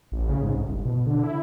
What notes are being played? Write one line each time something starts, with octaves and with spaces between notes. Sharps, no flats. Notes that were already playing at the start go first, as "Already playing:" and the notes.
A1
C#3
G#2
C2
G1
B2
D3
E4